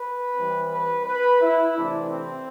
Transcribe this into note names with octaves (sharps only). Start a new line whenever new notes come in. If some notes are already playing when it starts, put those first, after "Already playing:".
Already playing: B4
E3 G3 C4
B4
B4
E4
C3 E3 A3 C4 D4
C4